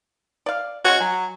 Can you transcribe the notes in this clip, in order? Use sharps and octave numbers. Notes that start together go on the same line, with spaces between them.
D5 F5
G#3 C#4 F#4 C#5
F#3 G#5